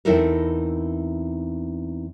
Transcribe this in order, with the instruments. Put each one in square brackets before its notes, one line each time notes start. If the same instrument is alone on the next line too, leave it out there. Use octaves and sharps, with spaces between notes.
[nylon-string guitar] E2 C4 D#4 E4 A4 A#4